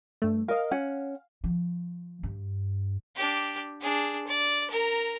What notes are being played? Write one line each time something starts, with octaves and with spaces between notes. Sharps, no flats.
G2 A3
A#4 D#5 F5
C#4 F#5
F3
G2
D4 G4
D4 G#4
D5
A#4 A#5